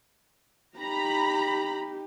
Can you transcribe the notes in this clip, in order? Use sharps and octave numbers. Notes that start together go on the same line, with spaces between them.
D#4 G4 A#5 B5